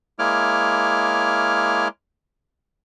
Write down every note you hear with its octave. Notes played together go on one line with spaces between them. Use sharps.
G#3 A#3 E4 C#5 D6 F6